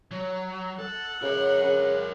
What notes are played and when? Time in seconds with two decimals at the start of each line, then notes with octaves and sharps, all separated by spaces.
0.12 F#3
0.79 A4 F#5
1.22 C#3 A#4 C#5
1.63 C#3